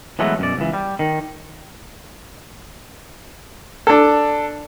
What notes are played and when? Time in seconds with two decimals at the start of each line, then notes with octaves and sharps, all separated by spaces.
0.19 E3 F#3 G#3 A3 B3
0.39 F#2 B2 D5
0.57 C#2 E3
0.74 G3
0.99 D#3
3.87 D4 A4